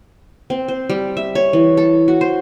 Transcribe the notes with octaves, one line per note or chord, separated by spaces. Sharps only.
C4
C5
G3
E5
C#5
E3
A4
F#4
C5